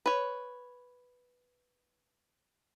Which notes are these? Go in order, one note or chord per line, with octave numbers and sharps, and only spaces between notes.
B4 C#5